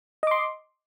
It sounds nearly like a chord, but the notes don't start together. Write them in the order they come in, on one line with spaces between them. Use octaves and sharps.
D#5 D6 C6